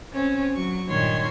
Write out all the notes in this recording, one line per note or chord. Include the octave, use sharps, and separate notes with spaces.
C4 C#4
F#3 C#6
G2 A#2 D#3 C#5 C6 G#6